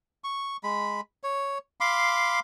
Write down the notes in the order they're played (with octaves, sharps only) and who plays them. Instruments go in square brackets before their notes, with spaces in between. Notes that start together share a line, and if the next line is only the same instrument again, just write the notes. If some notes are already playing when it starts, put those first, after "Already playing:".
[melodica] C#6
G#3 B5
C#5
F5 B5 C6 D6